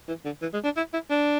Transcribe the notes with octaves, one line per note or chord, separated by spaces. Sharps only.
E3
D3
E3
G#3
D4
E4
E4
D4